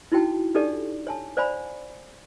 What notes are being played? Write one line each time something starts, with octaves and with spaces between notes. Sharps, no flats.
D#4 E4 F#4 G5 A5
D4 D#4 G4 A4 D5
C#5 G#5 A5
C5 D5 F5 G#5 A#5 B5